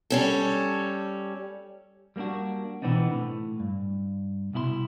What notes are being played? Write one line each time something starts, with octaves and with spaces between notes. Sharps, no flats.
G3 C#4 A4
G3 A#3 B3 D4 F#4
B2 E3 B3 C4 D4 D#4
A2
G2
C2 B2 E4 G4 C6